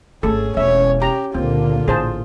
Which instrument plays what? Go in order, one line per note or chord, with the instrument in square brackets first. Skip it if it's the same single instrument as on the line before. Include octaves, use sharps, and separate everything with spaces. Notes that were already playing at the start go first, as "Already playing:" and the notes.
[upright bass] G#1 A3 [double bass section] C#4 [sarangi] G#4 [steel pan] A4
[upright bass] E1 [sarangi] C#5 [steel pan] E5
[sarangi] G4 [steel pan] A#5
[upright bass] C#2 [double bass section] A#2 D3 A#3 [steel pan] C4 [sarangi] F4
[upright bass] A1 [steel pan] G#4 C5 A5